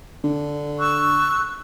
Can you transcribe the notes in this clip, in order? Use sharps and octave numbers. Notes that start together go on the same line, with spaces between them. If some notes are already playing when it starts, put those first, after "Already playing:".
D3
C#6 E6 F#6